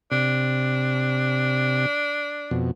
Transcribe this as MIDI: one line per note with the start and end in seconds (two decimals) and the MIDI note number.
0.11 1.86 48
0.11 2.59 62
2.51 2.71 41
2.51 2.71 47